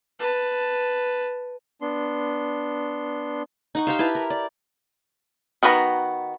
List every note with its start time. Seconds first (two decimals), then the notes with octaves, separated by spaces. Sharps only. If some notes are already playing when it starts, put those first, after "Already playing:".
0.19 B4 A5
1.81 B3 D4 C6
3.75 D#4 F#5 C#6
3.87 G4 C5 F5
3.99 E4 B4 A5
4.15 A#4
4.30 D5
5.63 D#3 B3 F#4 B4 A#5